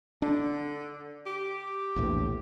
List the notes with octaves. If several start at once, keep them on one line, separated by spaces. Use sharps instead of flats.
D3 D4
G4
A#1 E2 A2